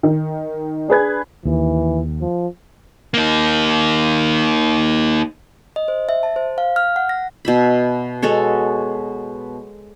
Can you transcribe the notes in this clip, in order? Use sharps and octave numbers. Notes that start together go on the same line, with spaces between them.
D#3
D4 G#4 B4 G#6
D#2 E3
F3
A#3 D#4
D#5
C5
E5
A5
C5
F5
F6
F#5
A#6
B2 E5 B5
G#3 F#4 A4 C#5